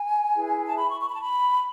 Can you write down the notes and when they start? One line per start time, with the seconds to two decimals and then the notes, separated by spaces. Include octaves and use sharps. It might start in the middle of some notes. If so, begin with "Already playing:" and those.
Already playing: G#5
0.35 E4 G#4 B4
0.68 A5
0.78 B5
0.89 C#6
1.00 C#6
1.08 B5
1.14 A5
1.22 B5